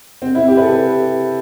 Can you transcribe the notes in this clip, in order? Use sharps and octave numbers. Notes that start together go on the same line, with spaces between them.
C4
E4
G4
B4
A4